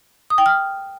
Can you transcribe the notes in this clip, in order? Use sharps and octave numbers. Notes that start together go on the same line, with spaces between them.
D#6
G5
F6